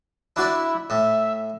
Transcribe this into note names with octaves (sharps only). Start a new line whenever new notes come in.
D4 E4 F#4 D5
A2 E5